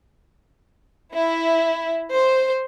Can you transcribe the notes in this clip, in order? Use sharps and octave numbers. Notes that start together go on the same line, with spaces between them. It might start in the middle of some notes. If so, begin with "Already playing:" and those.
E4
C5